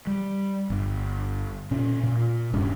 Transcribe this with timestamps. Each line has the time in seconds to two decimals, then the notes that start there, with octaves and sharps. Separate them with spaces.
0.07 G3
0.70 G1
1.71 A#2 C#4
2.03 A#2
2.53 D#1 G2 C#4